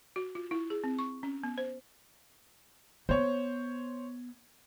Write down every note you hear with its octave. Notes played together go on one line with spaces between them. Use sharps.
F#4
F4
E4
G#4
C4
C#6
C#4
B3
C5
B3 C5 C#5